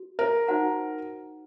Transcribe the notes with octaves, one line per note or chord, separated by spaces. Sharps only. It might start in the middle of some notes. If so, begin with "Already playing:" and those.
Already playing: F#4
A#4
D#4 F#4 C5 F#5 A#5